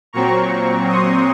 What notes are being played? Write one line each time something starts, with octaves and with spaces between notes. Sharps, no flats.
A#2 F#3 C4 A#5 C#6
C6 D#6